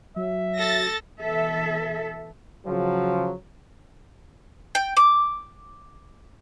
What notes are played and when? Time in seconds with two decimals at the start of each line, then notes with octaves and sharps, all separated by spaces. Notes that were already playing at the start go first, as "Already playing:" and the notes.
0.16 F#3 E5
0.58 A4 A6 A#6
1.20 B2 E3 A4 E5
2.66 C#3 F3 F#3
4.75 G5
4.97 D6